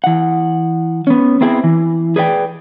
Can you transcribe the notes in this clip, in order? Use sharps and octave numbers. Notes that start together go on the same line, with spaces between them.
E3 F#5
B3 C#4
B3 C4 E4 G#4
E3
G#4 B4 D5 G5